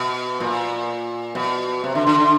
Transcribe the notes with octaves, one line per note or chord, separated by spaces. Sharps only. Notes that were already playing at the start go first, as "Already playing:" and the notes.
Already playing: B2
A#2
B2
C3
D3
D3
D3